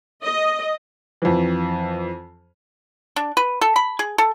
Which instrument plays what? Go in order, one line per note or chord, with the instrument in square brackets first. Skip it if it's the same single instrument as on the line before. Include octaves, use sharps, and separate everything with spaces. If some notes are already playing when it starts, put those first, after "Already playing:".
[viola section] D#5
[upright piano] F2 E3
[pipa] D4
B4
A4
B5
G#4
A4